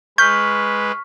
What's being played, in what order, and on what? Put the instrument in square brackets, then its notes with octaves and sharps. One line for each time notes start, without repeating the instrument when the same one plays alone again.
[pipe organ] G#3 B4 [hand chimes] C#6 F6 B6 [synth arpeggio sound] G6